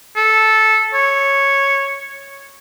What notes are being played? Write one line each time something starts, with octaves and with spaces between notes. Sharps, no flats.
A4
C#5